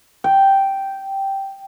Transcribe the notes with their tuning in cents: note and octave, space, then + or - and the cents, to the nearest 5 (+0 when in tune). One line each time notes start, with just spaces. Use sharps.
G5 -5